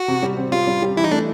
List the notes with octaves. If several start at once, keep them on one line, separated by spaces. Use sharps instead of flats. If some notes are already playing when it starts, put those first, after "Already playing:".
Already playing: F#4
C3
G3
C4
G3 F4
G3
G3
E3 E4
D#4
A3 D4